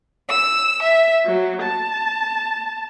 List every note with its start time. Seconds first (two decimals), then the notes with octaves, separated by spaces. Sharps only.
0.29 E6
0.82 E5
1.26 F#3
1.61 A5